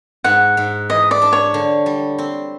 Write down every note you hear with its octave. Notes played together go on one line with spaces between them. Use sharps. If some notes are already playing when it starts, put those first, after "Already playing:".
G#2 F#5
G#2
E3 D#5
D5
D4
C#5
D3
G3
C4